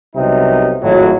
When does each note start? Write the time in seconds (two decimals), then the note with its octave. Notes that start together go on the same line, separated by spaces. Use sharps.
0.15 C2 C3 F#3 B3 D#4
0.81 G#1 F2 A2 F#3